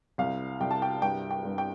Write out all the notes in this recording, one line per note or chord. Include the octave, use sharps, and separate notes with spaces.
C2 F5
C2 G5
A5
G5
G2 G5
G5
G2
G5